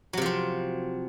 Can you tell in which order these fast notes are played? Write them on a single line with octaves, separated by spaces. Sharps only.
F#3 C3 F3 C4